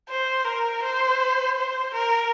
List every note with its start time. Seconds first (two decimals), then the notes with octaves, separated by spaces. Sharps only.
0.09 C5
0.45 A#4
0.83 C5
1.56 C5
1.94 A#4